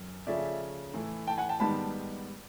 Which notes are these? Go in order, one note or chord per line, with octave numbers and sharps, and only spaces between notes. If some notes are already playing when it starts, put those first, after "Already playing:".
Already playing: F#2
C#3 F3 A3 C#4 D5 E5
A2 E3 A3
G5 A5
F#5 G#5
G5 A5
G#2 D#3 G3 B3 A5 B5